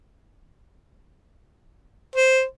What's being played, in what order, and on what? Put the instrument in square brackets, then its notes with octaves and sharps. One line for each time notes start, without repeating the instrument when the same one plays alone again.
[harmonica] C5